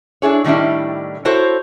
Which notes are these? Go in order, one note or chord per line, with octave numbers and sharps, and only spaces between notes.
D4 E4 G#4 C#5
A2 D#3 G3 C#4 D4 E4
E4 F#4 A4 C5 C#5